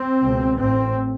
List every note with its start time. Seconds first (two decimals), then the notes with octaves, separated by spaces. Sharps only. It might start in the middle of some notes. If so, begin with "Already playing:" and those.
Already playing: C4
0.21 C#2 B2
0.57 A1 A2 C4